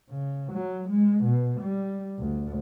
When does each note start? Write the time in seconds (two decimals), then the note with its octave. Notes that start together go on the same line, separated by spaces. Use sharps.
0.10 C#3
0.53 F#3
0.89 G#3
1.24 B2
1.61 G3
2.20 D2